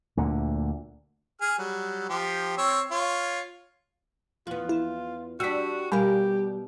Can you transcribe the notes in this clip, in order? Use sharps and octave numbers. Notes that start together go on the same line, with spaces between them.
D2 A#2 D3
G#4 F6
F#3 G3
F3 G4
C4 C#5 E6
F4 C#5
E2 F3 B3 F4
E4
G3 D4 F#4 E6 B6
B2 G3 G4 A#4 F5 G#5 B5